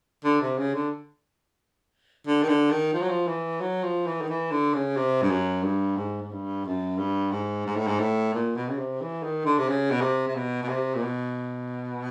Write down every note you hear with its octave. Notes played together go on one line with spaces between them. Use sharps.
D3
C3
C#3
D3
D3
D#3
D3
D#3
F3
F#3
F3
E3
F#3
F3
E3
D#3
E3
D3
C#3
C3
G2
F#2
G2
G#2
G#2
G2
F#2
G2
G#2
G#2
A2
G#2
A2
A#2
B2
C#3
C3
E3
D#3
D3
C3
C#3
B2
C3
C3
B2
B2
C3
A#2
B2